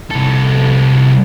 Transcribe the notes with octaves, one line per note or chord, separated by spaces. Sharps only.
C2 A4